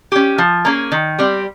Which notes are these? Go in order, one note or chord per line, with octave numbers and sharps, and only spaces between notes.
C#4 G4
F3
A#3 C#4 G#4
D#3
G3 C4